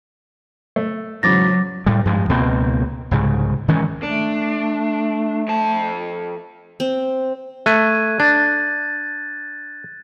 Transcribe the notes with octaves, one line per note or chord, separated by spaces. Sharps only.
A3
E2 G#2 C#3 F#3 D6 A6 A#6
A2 G3
G2 F3 G#3
C#2 B2 A#3 C4
C2 G#2 C#3
D#3 E3 G#3 C#4
A3 D4
F2 A5
C4
A3 F#6 G#6 D#7
D4 A6